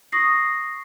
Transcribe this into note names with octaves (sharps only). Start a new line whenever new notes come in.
C#6 D#6 A#6 C7